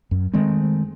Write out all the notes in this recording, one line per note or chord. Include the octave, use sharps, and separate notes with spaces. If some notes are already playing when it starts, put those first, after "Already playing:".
F#2
D#3 G#3 A3 C4